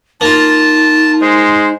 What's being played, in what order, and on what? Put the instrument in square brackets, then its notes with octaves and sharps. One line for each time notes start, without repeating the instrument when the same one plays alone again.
[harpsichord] A#3 F4 [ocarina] D#4 [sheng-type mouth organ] A5
[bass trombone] G#3 [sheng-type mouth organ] C5